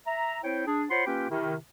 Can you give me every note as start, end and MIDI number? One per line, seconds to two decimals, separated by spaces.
0.06 0.39 76
0.06 0.39 82
0.44 0.65 60
0.44 0.65 64
0.44 0.65 72
0.44 0.65 73
0.44 0.65 79
0.67 0.84 62
0.67 0.84 68
0.90 1.06 65
0.90 1.06 72
0.90 1.06 73
0.90 1.06 78
0.90 1.06 83
0.90 1.06 84
1.06 1.28 58
1.06 1.28 61
1.06 1.28 65
1.06 1.28 67
1.06 1.28 71
1.06 1.28 79
1.29 1.55 48
1.29 1.55 51
1.29 1.55 64